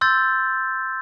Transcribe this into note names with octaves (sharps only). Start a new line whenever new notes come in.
C6 E6 G6 A6